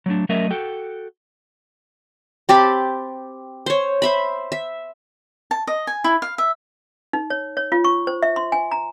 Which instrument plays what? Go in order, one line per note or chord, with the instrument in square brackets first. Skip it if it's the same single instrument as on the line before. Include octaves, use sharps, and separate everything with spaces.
[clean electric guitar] F#3 A3 D4
F#3 A3 C#4 A#4 D#5 E5
F#4 A4 G5
[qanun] C4 G4 A5 B5
C5 C#5
C5 E5 B5
E5
[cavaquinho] A5
D#5
G#5
E4
F5
E5
[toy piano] D#4
C#5
C#5
F4
C#6
C5
E5
C6
G#5
A#5